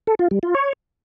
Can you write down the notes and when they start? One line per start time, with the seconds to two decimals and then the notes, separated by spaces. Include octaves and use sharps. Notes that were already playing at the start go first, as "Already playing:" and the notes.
0.07 A4
0.19 F4
0.31 G3
0.43 F4
0.55 C#5